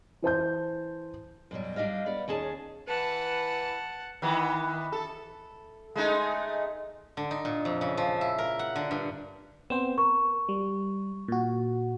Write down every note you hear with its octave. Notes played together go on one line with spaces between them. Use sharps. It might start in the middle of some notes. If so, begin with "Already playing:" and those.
E3 C5 A5 G6
F#2 B2 F#3 G3
G3 D4 G4 D#5 F5
B3 D5
D#2 C#4 G#4 A5
E3 B4 F#5 A5
D#3 E3 B3
A4
G#3 A3 D#4
D3
D#4
A#2
F2
C#3
F3
E4
A#4
F#5
D3
G2
B3 C4 C5 E7
A#4 C#6
G3
A#2 F#4